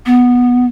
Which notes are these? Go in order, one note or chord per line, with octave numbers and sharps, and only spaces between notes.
B3